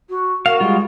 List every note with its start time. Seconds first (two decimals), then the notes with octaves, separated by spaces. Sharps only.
0.09 F#4
0.46 F#4 A#4 F5
0.60 G3 G#3 F4